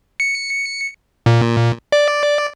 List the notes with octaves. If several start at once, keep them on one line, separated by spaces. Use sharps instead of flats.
C#7
A#2
D5